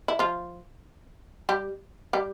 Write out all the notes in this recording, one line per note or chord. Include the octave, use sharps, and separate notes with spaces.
E4
F3 F4
G3 G4
G3 G4